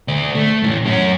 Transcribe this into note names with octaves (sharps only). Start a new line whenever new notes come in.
D2 D5
A3
A2 E3
F#2 C#4